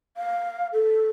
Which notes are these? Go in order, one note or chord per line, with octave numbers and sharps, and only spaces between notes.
F5
A4